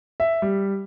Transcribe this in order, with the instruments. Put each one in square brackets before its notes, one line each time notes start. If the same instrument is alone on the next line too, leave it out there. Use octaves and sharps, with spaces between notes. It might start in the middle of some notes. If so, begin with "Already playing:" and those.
[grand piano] E5
G3